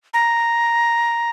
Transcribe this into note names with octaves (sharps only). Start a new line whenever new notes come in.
A#5